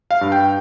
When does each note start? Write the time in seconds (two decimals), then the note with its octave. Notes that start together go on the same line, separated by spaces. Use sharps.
0.11 F5
0.21 G2
0.32 G5